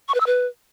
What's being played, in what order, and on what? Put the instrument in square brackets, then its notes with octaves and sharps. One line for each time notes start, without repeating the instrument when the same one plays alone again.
[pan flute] C#6
B4
E6
B4